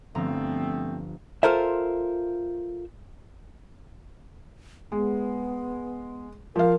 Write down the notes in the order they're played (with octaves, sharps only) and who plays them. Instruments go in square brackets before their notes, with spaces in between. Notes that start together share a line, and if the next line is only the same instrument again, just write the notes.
[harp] G1 F3 A#5 [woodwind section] A3 B3 C4
[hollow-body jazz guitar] F4 A4 A#4 C5 E5
[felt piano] G#3 [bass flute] B3
[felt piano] F3 F5 [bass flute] A#4